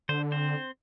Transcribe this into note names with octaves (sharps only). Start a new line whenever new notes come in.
D3 C5
C4 C5